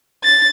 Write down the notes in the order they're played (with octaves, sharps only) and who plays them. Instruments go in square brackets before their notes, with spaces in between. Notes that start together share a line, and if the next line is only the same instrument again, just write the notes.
[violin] A6